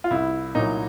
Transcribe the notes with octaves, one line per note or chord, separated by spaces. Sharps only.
F4
C2 E4
A#2 F#3 D#4